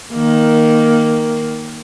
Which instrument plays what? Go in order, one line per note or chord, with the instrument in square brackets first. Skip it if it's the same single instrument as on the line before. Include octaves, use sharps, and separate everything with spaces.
[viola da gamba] D#3 A#3